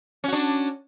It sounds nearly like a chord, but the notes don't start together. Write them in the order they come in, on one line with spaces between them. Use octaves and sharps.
C#4 F#4 D4